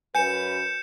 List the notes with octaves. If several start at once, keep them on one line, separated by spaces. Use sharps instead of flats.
F#2 B4 G#5 G6 C#7 E7